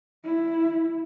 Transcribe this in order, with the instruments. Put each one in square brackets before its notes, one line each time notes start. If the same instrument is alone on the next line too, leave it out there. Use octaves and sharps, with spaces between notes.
[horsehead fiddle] E4